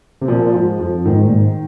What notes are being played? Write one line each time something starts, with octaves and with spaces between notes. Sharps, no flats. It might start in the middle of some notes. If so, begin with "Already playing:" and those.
C3
A#2 F3
G#2 F3
F2 F3
G#2 D#3
A#2
G#2